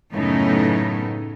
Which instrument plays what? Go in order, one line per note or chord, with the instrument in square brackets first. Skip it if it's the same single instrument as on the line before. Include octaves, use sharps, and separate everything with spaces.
[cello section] F#2 A2 C#3 A3 B3 D#4